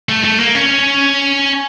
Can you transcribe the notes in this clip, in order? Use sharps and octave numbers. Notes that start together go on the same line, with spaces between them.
A3
A3
A#3
C#4